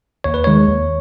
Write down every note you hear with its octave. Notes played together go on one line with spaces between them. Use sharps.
D#2 C#5
B4
D#3 G#3 C#5
D#2